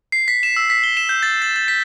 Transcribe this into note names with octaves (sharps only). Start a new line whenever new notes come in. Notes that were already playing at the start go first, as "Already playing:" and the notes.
C7
B6
E7
E6
B6
G7
E7
G6
A6
A6
A6
B6